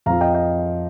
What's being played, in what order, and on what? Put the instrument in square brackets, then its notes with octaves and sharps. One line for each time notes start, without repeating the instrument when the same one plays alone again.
[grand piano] F2 F3 F5 A#5
D#5 G5
D#5 G5